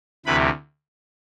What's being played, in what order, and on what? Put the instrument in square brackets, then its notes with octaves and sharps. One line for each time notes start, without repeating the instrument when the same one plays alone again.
[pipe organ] D2 C3 E3 B4 B5